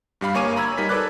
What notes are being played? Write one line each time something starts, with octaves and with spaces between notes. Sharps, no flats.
G2 G3 F5 B5
G1 A#3 C#5 G#5 D6 D#7
A#5 B5 E6 G#6
G3 D#4 A#4 B6
A4 B4 D5 D6 F#6